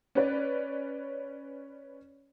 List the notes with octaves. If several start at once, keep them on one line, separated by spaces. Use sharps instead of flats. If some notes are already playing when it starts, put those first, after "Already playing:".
C#4 B4 D5